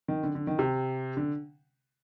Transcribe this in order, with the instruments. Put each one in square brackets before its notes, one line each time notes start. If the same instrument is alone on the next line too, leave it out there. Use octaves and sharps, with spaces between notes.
[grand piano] D#3
D3
D3
D#3
C3
D3